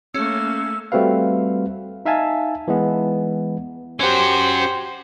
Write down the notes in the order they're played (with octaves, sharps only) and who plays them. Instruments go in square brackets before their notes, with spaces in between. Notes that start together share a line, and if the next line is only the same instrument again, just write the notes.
[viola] A3 A#3 [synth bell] C#4 [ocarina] E6
[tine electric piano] G3 A3 C4 F#4 B4 F5
D#4 E5 F5 G#5 A5
E3 G#3 B3
[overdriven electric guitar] C#4 F#4 [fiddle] G4 C5